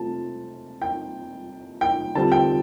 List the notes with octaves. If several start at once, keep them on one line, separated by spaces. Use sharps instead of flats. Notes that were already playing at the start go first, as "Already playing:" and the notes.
Already playing: C3 A3 C4 F4 A5
G5
G5
D3 G3 C4 F4 A5
G5